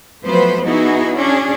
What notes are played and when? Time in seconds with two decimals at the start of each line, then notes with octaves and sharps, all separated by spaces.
0.22 F3 F#3 A3 B3 B4 C5
0.63 B3 D#4 E4 F#4 G#4
1.17 C#4 D4 G#4